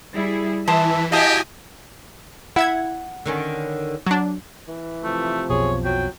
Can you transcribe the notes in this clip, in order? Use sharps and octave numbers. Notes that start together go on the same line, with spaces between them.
G3 E4 G#4
E3 E5 A5 C6 D#6
E4 F#4 G4 D#5 F5 G#5 A5 D#6
E4 E5 F#5 G#6
D3 D#3 C#4
F#3 D4
E3
C3 F3 A3
B1 F2 B2 G#4 C#5
F#3 G5